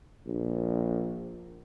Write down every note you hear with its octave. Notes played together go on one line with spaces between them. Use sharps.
A#1